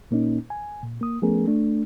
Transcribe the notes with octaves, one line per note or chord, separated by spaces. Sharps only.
A#2 A#3 C#4 D#4
G#5
A#2
A#3 D#6
F3 A3 B3 C#4 G#4 A#4
A3 D4